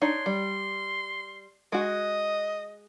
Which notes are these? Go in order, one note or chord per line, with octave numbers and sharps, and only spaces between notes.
D4 D#4 C#5 C6
G3
G#3 F#4 D#5